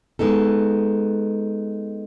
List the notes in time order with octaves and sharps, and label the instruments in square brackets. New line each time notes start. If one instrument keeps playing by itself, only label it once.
[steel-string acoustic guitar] G#3 B3 D#4 A4